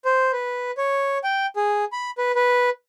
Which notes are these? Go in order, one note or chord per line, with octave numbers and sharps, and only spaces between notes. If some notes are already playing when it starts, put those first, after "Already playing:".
C5
B4
C#5
G5
G#4
B5
B4
B4